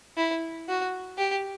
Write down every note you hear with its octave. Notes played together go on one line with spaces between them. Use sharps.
E4
F#4
G4